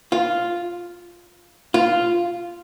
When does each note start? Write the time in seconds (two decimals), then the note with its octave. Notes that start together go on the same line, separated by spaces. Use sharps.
0.12 F4
1.74 F4